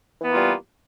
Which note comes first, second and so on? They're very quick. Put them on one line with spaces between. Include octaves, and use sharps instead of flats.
E3 B3 A#3 F4 G3